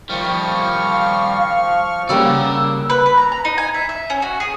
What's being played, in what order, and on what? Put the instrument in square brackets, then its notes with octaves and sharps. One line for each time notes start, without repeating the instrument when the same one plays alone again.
[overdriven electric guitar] D#3 G3 [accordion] F3 C#6 F6
[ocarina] F5
[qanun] C#3 G3 A#3 [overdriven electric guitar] D5 F#5 [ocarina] E6
[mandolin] B4
B4
A#5
A#5
D#4
G#5
E5
E5
C#4
F#4
G#4